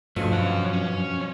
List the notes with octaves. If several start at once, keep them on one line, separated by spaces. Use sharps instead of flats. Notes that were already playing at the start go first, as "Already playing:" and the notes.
G2 B2 F3 A3 C#4
F#2 C#4 F#5
C#4